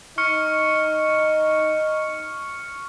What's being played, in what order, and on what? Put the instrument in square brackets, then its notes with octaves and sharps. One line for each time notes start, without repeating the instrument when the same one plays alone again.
[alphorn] D#4 [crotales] C#6 F6 C#7